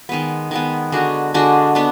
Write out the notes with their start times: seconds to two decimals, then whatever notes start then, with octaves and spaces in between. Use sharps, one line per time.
0.09 D#3 G#3 B3
0.51 D#3 G#3 B3
0.92 D3 G#3 D4 F#4
1.34 D3 G#3 D4 F#4
1.75 B3 D4